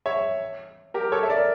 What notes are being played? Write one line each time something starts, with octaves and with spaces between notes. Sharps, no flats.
C#5 E5
G4 A#4
A4 C#5
E5
A#4 D5